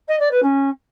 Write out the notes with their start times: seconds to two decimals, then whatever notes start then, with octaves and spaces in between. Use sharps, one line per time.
0.08 D#5
0.20 D5
0.31 B4
0.42 C#4